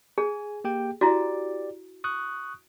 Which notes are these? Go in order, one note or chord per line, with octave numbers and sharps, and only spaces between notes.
G#4 G#5
A#3 G4 G5
E4 F#4 G4 D5
C#6 D#6 F#6